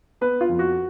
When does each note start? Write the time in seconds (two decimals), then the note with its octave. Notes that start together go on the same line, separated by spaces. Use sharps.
0.21 B3 B4
0.41 F4
0.49 F2
0.59 F#4